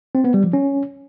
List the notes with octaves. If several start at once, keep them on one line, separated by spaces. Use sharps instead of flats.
C4
B3
G3
F3
C#4